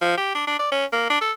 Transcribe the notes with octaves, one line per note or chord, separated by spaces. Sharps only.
F3
G4
D4
D4
D5
C#4
A#3
D4
A4